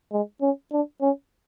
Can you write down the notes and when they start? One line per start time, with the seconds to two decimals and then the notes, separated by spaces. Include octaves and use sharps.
0.12 G#3
0.41 C#4
0.72 D4
1.01 C#4